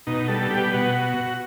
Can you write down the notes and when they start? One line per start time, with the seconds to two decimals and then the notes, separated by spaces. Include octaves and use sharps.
0.07 B2 D#4
0.28 G3 A4
0.50 B3 G4
0.73 B2 F#4